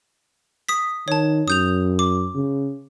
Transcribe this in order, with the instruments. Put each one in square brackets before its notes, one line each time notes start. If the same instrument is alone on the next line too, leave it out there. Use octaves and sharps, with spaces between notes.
[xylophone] D#6 B6
[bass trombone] D#3 [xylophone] C#5 A5
[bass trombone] F#2 [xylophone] D#6 G6 F7
[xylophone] D6
[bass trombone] C#3